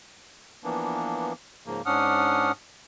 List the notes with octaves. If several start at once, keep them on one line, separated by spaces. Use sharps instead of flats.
E3 F3 A#3 B3 D4
G#2 C#3 F3 A#3
G#2 C#4 D4 F#5 D#6 F6